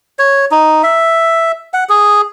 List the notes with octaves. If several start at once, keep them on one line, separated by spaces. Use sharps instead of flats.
C#5
D#4
E5
F#5
G#4